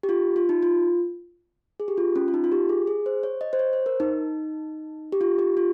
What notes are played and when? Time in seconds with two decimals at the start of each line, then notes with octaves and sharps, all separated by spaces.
0.03 G4
0.09 F4
0.36 F4
0.49 D#4
0.63 F4
1.80 G#4
1.88 G4
1.97 F4
2.16 C#4
2.28 F4
2.34 D#4
2.44 F4
2.52 G4
2.69 G#4
2.87 G#4
3.06 C5
3.23 C#5
3.41 D#5
3.53 C5
3.59 C#5
3.73 C5
3.86 A#4
4.00 D#4
5.12 G4
5.21 F4
5.39 G4
5.57 F4